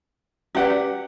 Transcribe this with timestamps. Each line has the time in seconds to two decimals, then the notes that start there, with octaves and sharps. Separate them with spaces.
0.55 C#4 G4 B4 D5 F#5